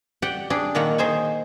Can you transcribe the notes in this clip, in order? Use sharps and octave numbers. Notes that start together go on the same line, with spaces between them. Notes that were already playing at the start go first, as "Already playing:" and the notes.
G4 D5 F#5 G5
D4 G4 G#4 D5
A#2 D#3 A#3 F#5
D#3 G#4 C5 G#5